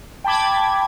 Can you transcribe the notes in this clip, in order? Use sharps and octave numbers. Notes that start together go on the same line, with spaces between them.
G5 A5 B5 D6 G#6